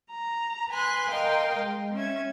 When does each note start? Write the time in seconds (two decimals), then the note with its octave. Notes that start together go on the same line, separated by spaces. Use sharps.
0.10 A#5
0.71 B4 G#5 C6 F#6
1.09 A#4 D#5 F5 G5 C6
1.57 G#3
1.94 C#4 E5 G#6